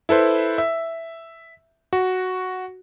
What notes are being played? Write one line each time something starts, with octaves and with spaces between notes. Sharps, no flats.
E4 A4 B4 C5
E5
F#4